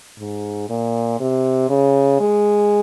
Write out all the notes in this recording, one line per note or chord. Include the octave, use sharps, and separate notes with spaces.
G#2
A#2
C3
C#3
G#3